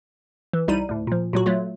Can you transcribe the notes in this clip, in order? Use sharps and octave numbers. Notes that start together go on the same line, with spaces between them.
E3
C2 G3 D#4 E4 B5 D#7
D2 A2
A#2 F3
A#2 F#3 F#4
F#3 A3 F4